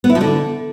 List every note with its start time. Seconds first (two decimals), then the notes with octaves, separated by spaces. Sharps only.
0.04 B3
0.10 E4
0.15 F3
0.21 D3